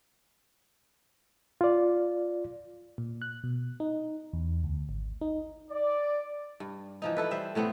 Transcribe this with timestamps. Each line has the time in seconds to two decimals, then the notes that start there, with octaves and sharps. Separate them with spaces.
1.61 F4 D5
2.98 A#2
3.22 F#6
3.44 B2
3.80 D#4
4.33 E2
4.64 D2
4.89 G#1
5.21 D#4
5.71 D5
6.60 G2
7.02 E3 F3 D#4
7.17 E4 A4 B4
7.31 G3 C5 E5
7.55 A2 A3 B3 C4